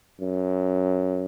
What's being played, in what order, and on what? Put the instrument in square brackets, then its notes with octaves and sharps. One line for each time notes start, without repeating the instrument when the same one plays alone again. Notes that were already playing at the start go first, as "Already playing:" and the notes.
[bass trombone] F#2